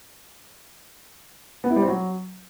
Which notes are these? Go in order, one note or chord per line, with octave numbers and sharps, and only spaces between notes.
B3
E4
G3
C4
F#3